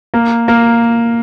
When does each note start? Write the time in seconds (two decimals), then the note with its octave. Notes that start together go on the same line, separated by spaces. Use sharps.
0.14 A#3
0.48 A#3